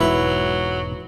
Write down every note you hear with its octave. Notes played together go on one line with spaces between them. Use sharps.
E1 G#2 F#3 E4 B4